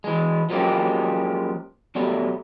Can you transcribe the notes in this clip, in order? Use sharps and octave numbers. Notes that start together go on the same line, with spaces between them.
E3 G#3
F3 F#3 G#3 A#3 C#4 G4
B1 B2 F#3 G3 A3